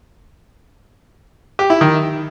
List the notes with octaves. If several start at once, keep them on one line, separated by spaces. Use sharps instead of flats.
G4
E4
D#3